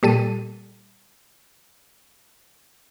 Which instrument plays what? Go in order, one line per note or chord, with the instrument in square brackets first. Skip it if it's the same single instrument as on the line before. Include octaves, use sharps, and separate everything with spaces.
[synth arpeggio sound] A#2 G3 A4 D#7